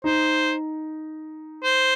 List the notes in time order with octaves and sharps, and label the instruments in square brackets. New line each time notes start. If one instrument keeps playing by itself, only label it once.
[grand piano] D#4 [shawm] C5
[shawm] C5